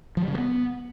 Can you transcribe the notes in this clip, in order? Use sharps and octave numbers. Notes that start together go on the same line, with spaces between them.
F3
G3
C#3
G3
B3